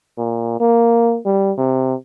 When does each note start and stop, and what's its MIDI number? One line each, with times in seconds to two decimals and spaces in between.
0.18 0.55 46
0.60 1.19 58
1.25 1.52 55
1.58 1.94 48